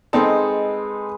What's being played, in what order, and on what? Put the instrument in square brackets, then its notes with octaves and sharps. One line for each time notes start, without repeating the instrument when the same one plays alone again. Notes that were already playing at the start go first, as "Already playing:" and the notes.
[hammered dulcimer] G#3 B4 D#5 [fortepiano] C4 D#4 A4